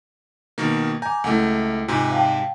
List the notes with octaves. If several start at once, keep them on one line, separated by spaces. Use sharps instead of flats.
B2 D#3 A#3
G#5 A#5 D6 G6
C#2 A3 E4 F#5
G#2 C3 F4 G#5 G6
F5 G5 A5